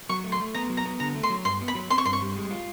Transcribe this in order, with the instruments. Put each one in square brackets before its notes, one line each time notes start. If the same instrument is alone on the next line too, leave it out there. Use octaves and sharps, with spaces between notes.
[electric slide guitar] F#3 [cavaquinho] C#6
[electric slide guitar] A3
[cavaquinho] C6
[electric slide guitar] A3
[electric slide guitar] B3 [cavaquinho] A#5
[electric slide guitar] F#3
[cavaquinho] A#5
[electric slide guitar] B3
[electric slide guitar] D3 [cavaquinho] A#5
[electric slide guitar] A3
[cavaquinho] C6
[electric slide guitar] F#3
[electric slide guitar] G2 [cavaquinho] C6
[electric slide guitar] B3
[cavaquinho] B5
[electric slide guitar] F#3
[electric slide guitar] C4 [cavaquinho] C6
[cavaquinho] C#6
[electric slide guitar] G2 [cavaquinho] C6
[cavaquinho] C#6
[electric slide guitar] G3
G#3
F4